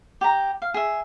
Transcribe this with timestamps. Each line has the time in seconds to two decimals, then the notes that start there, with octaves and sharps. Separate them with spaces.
0.21 G4 A#5
0.62 F5
0.74 G#4 E5